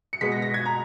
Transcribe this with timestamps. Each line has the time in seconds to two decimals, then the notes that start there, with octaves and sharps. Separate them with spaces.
0.13 C#7
0.21 B2 G#3 B3 B6
0.32 A#6
0.42 A#6
0.54 G#6
0.66 A#5